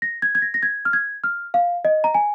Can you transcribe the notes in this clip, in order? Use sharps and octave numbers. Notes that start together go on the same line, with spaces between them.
A#6
G#6
G#6
A#6
A#6
G#6
F6
G#6
F6
F5
D#5
A#5
G#5